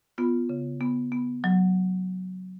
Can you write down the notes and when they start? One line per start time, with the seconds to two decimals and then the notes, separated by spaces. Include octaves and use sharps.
0.18 B3 F4
0.49 C#3
0.81 B3
1.12 B3
1.44 F#3